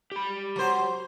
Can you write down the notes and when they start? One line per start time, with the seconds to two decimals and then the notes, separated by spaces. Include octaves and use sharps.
0.12 G4 B5
0.56 F#3 C5